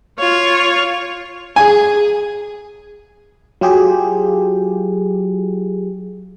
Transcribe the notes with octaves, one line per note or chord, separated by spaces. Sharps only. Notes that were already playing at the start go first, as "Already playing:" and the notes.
F4 C#5
G#4 G#5
F#3 F4 G4 G#4